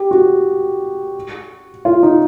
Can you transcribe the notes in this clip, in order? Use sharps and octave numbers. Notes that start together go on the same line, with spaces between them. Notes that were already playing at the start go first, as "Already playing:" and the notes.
Already playing: G4
F#4
F4
D#4